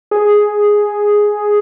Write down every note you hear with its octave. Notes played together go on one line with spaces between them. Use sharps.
G#4